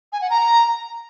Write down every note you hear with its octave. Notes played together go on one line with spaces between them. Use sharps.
G#5
F#5
A#5